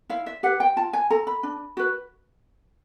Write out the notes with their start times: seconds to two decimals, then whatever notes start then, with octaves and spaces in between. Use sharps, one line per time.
0.10 E4 F5
0.26 E5
0.43 G4 B4 F#5
0.60 G5
0.77 F4 A5
0.93 G#5
1.10 A4 A#5
1.27 B5
1.43 D4
1.77 F#4 B4